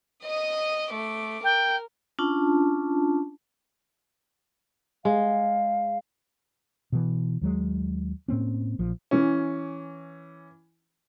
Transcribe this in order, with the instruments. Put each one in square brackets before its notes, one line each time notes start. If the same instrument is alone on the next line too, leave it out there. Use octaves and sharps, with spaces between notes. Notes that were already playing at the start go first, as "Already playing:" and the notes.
[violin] D#5 D#6
A3 D6
[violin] A#4 [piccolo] G5
[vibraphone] C#4 D4 F4 A5
[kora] G#3 [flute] F5
[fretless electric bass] B2 E3
D#2 F#3 G#3
A2 A#3 C4 C#4
A#1 F3
[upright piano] E3 C#4